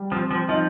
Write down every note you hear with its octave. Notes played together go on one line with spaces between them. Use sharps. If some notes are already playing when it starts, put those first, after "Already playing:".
Already playing: G3
F3 C4
F3
F3 D#4